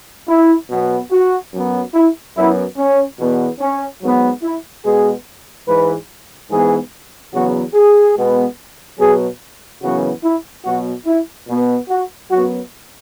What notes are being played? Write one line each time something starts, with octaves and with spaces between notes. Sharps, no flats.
E4
B2 F#3 B3
F#4
F#2 F#3 B3
E4
F#2 F#3 B3 E4
C#4
E2 B2 B3
C#4
G#2 F#3 B3
E4
B2 G#3 B3 G#4
G#2 E3 G#3 B4
G#2 E3 B3 G#4
E2 C#3 F#3 B3 F#4
G#4
B2 G#3 B3
B2 F#3 B3 G#4
F#2 C#3 E3 B3 F#4
E4
B2 F#3 B3 F#4
E4
B2 B3
F#4
F#2 F#3 B3 F#4